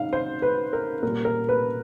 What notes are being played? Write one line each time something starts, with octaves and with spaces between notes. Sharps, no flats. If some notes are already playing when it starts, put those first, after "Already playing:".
Already playing: G#2 F5
C5
B4
A#4
A#2 G3 A#4
A#4
B4